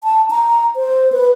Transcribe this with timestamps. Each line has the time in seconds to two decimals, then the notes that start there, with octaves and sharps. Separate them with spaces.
0.04 A5
0.31 A#5
0.76 C5
1.12 B4